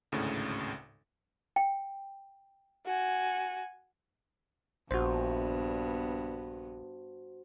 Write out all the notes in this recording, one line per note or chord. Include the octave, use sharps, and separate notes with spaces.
G#1 D2 A2 C#3
G5
F#4 G#5
A#1 G2 B3 F#4 C5